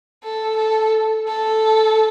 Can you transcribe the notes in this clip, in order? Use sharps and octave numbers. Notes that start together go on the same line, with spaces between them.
A4
A4
A4